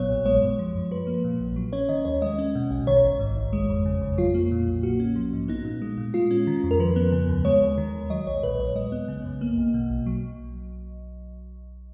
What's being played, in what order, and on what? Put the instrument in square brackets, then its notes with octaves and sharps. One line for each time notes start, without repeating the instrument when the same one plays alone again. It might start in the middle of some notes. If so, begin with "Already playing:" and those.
Already playing: [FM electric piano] G#1 A#2 F#3 B3 C#5
B1
G#3 C#5
F#2
F3
F#2
F3 B4
A#3
A#2
A#1
F#3
C#4 C#5
D#3 D#5
D#2 C#5
G#3 D#5
C#4
B2
B1
D#3 C#5
G#1
G#2
G#1
G#3
F2
C#3
F2
F#3 F4
A#3
A#2
B1
A#3 F#4
C#4
F3
G#2
B3 D#4
A#2
G#3
A#2
G#3 F4
C#4
D#3
F2
A#4
F3 B4
B3
C#3
D#2
G#3 C#5
D#2
D#3
D#2
F#3 D#5
B1 C#5
A#2 B4
B1 C#5
G#3 D#5
B3
C#3
F#2
A#3
B1
B2
B1
F#3